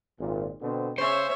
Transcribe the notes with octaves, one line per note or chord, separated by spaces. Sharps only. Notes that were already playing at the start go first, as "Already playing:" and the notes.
G#1 A#2
B2 D3 C4
C#3 C#4 C5 C#5 E5